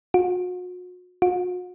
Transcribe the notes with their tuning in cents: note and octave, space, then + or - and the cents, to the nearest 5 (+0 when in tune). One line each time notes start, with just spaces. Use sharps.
F#4 -40
F#4 -45